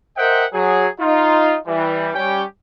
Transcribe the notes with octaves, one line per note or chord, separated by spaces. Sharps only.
A#4 C5 D#5 E5 F#5 G5
F#3 G#4
D#4 F4
E3 G3
G3 C#4 G4 G5